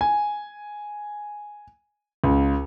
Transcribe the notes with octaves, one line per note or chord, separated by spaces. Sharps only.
G#5
C#2